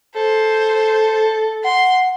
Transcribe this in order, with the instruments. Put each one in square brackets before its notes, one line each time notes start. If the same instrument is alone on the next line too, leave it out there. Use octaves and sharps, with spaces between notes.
[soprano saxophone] A4 [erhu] C5
[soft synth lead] F#5 [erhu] C6